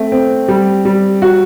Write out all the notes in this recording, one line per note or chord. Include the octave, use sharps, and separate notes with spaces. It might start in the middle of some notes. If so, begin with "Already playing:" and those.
Already playing: A3 C4
C4
G3
G3
F#4